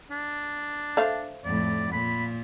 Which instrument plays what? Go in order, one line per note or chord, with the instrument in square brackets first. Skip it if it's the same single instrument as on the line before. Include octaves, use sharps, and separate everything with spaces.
[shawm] D4
[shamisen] A3 C5 F5
[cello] F2 A2 [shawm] D5
[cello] A#2 [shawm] B5